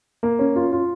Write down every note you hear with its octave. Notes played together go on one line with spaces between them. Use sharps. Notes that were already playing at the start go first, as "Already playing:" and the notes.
A#3
C#4
F4
F4